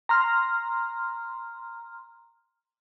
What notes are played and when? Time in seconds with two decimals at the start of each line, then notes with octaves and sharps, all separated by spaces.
0.09 A#5 C6 F6